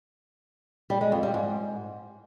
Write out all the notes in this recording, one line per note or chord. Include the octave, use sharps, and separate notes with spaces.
G3
G#3
F2
G3
G#2